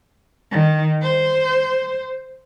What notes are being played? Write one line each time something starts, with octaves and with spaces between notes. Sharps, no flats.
D#3
C5